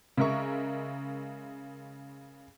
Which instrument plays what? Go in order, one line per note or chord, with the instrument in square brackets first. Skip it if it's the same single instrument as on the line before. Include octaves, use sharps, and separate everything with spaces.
[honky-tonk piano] C#3 G#3 A#4 E5 C#6